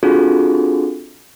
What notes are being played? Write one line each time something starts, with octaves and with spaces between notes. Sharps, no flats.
C4 D4 F4 F#4 G#4 A4